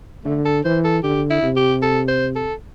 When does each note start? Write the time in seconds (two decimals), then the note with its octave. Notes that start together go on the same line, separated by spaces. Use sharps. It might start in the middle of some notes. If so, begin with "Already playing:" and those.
0.24 D3 A3
0.45 A4
0.64 E3 C5
0.84 A4
1.03 D3 G4
1.30 E4
1.43 C3
1.57 G4
1.82 A4
2.08 C5
2.36 A4